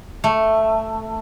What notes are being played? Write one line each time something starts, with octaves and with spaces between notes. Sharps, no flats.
A3